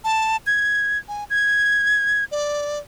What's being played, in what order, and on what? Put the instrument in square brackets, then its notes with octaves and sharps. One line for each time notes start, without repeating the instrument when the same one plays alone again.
[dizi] A5
G#6
G#5
G#6
D5